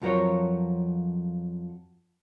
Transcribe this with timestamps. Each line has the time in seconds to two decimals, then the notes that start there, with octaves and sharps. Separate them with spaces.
0.02 F2 F3 F#3 A#4 C5 C#5